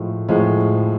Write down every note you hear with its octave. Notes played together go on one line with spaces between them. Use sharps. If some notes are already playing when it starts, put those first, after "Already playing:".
Already playing: A2 F3 G#3
A2 F3 G#3